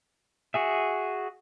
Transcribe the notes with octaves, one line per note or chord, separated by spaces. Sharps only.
F#4 G#4 E5